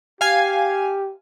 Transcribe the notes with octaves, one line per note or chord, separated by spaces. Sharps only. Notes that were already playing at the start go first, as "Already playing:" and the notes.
G4 F5 G#5